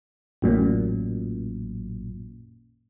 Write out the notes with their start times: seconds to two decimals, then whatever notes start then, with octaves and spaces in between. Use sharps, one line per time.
0.42 A1 F#2 A#2